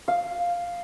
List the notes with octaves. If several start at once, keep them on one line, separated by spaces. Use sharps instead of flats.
F5